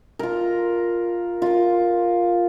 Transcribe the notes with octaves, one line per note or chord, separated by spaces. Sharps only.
F4 A#4
F4 A#4